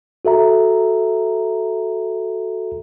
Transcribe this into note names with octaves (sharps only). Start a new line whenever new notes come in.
F#4 A4 E5 A#5